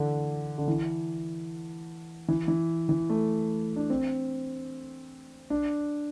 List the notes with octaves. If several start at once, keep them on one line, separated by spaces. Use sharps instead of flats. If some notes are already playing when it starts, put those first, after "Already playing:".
Already playing: D3 E3
D3
E3
E3
E3
E3
A3
D4
C4
D4